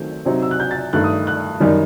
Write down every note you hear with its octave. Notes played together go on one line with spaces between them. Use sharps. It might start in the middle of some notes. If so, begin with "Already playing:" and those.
Already playing: D#3 F#3 A3 C4 G6
C3 F#3 C4 D#4
E6
F#6
G6
A6
G2 D#3 A3 D#4 F#6
D#6
F#6
F#2 D#3 G3 D#4